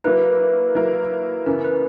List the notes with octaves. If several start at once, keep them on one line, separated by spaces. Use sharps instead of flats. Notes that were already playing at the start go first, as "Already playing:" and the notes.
F#3 A#3 E4 A#4 B4
F#3 A#3 E4 A#4
F#2 C#3 E3 B3 A#4
B4